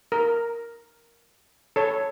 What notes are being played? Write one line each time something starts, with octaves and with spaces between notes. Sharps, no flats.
A#4
A4 C#5